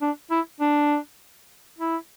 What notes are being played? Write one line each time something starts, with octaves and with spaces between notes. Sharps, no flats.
D4
E4
D4
E4